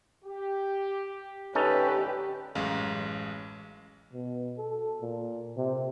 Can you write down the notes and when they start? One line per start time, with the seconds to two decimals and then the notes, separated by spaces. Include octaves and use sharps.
0.24 G4
1.55 A2 D3 C#4 D#4 G4 A4 B4
2.55 A1 F#2 G#3 F5
4.13 B2
4.58 A4
5.01 A#2
5.57 C3